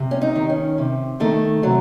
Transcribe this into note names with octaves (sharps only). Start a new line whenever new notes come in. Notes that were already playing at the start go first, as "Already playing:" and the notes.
Already playing: C3
C#4
D#4
D#3
C#4
C3
D#3 A3
C3 F#3